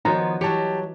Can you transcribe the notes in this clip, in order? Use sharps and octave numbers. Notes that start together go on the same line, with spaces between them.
D#3 F3 B3 D#4 F#4 C#5 A#5
E3 F#3 G4 C#5 A5